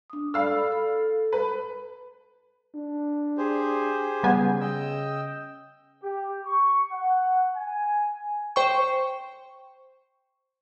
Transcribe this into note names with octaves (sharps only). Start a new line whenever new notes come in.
D4 D#6
A4 D5 F5 B5 E6
A4
B4
D4
G4 G#4 C5
C#3 G3 B3 G#5
D#5 G5 E6
G4
C#6
F#5
G#5
C5 G5 C#6